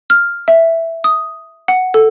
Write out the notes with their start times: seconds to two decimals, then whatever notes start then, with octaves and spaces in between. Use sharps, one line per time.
0.10 F6
0.48 E5
1.04 D#6
1.68 F#5
1.94 A4